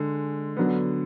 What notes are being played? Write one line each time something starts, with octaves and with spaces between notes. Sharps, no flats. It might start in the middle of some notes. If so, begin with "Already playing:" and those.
Already playing: D3 G#3
D3 F#3 B3